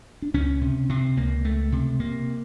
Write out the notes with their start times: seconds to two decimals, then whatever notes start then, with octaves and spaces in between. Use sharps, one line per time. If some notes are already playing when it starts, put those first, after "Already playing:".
0.22 D4
0.34 C#2 C#4
0.61 C3
0.89 C3 C4
1.17 C#2 A#3
1.44 C#2 A3
1.72 C3
2.00 C3 A#3